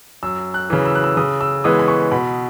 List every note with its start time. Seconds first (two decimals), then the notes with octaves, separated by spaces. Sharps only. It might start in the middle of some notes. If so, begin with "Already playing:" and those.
0.23 F#2 E6
0.54 F#6
0.70 C#3 E3
0.86 E6
0.95 F#6
1.04 E6
1.17 C#3 D#6
1.41 E6
1.64 E3 G#3 B3 D#6
1.79 B5
1.88 C#6
2.11 B2 B5